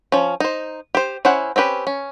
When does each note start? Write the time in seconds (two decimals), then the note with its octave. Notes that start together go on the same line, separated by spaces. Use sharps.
0.12 F3 C#4
0.40 D#4 C5
0.95 G4 C5
1.25 C#4 E4 C5 F#5
1.56 C4 C#4 G4 B4
1.87 C#4